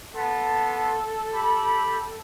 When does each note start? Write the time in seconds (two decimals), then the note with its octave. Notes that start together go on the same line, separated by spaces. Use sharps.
0.14 B3 A4 A5 C6
1.33 G4 B5